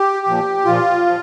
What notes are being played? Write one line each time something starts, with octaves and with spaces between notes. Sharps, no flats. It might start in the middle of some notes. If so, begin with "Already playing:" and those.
Already playing: G4
A#2 F3
A#2 F3 F4
F3